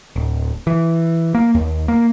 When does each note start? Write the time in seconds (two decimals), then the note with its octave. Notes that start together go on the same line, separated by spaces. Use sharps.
0.16 D1
0.67 E3
1.35 A#3
1.55 D#2
1.88 A#3